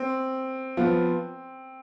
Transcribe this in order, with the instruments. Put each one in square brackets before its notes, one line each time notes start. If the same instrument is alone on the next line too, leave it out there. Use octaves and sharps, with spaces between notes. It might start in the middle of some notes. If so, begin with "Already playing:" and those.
Already playing: [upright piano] C4
[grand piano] F3 B3 F4